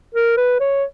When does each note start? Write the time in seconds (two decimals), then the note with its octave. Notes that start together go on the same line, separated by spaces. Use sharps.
0.14 A#4
0.37 B4
0.60 C#5